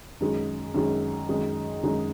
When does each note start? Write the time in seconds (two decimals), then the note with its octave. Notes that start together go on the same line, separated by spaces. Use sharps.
0.21 F#2 D#3 G#3
0.74 F#2 D#3 G#3
1.29 F#2 D#3 G#3 D#4
1.83 F#2 D#3 G#3 D#4